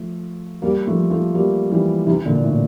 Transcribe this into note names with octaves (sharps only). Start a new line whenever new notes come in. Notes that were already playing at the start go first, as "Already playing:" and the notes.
Already playing: F3 A3
G3 A#3
F3 A3
F3 A3
G3 A#3
E3 G3
C3 E3
A#2 D3
A2